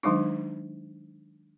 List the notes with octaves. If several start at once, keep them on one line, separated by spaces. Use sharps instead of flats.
D#3 F#3 G#3 D4 D#4